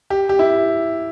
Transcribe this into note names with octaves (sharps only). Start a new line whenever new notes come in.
G4
G4
E4